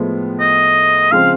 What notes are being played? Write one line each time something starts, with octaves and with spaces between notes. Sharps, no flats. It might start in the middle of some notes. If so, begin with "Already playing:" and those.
Already playing: A2 F3 G#3 B3
D#5
C#3 F3 G#3 C4 F5